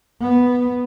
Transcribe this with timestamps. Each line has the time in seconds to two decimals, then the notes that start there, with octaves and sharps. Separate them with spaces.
0.21 B3